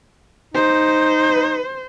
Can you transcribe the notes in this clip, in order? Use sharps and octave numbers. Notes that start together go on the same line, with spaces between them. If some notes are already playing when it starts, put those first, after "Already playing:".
D#4 C5